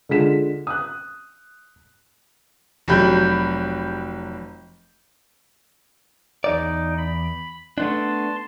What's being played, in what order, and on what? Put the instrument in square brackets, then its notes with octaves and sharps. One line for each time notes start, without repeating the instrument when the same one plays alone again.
[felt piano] D3 G#3 F4 B6 E7
D#6 F#6
[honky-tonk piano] F1 F#3 G4 B5 G6
[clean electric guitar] E2 D5 [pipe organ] D#4
[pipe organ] B5
[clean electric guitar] A3 B3 D4 [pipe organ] A5 C6